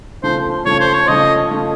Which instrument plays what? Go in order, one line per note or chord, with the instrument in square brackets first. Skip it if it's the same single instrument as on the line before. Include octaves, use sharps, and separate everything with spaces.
[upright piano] C#3 F3 A3 [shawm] C5
[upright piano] C#3 F3 A3 [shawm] C#5
[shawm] C5
C#5
[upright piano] C#3 F3 A3 [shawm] D#5
[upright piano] C#3 F3 A3